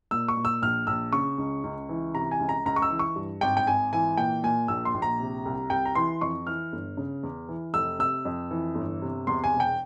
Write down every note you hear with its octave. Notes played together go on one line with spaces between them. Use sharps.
A#2 E6
C#6
A#2
E6
A#1 F6
A#1 E6
C#3 C#6
C#2
C#2
E3
C3 A#5
G#5
C#2
A#5
C#2 A#5
C#6
E6
E3
C#6
G2
G#1 G5
G5
G#1 G#5
E3 G#5
A#2 G5
A#2 G#5
A#1 E6
C6
A#1
A#5
C3
C2
C2 G5
A#5
E3 C6
F2 C#6
E3 F6
G1
C#3
E2
E3
F1 E6
C3 E6
F2
E3
G1
C3
E2 C6
G#5
E1
G5